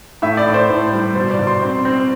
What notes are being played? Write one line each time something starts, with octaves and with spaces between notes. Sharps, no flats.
A2 E5
D5
A2
C5
A2 C5
G3
B2 C5
D5
B2
C6
C4
C4